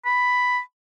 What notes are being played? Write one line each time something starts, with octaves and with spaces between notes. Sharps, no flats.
B5